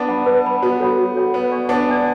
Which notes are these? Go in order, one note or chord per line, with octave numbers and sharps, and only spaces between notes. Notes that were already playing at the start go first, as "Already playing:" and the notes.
Already playing: B3 D4
F#5 B5
B4
F#5 B5
B3 F#4
A4 C#5 F#5 B5
F#4
A4 C#5 F#5 B5
B3 B4
D5 G#5 C#6
B3 D4 B4
D5 G#5 C#6